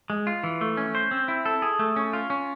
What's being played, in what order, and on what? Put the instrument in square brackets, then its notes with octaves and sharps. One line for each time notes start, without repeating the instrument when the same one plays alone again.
[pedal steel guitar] G#3
F4
E3
A3
C#4
C5
C4
E4
A4
G#4
A3
C#4
F4
C#4